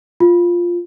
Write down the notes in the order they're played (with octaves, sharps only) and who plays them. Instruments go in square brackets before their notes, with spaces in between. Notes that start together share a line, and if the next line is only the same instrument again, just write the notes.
[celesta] F4